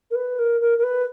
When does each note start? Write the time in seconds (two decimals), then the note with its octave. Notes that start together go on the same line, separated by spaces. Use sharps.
0.10 A#4
0.15 B4
0.38 A#4
0.61 A#4
0.78 A#4
0.83 B4